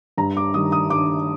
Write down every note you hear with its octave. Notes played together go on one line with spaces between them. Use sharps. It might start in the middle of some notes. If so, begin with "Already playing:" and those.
G2 A#5
D6
D#3 G3 D#6
D#6
G2 D6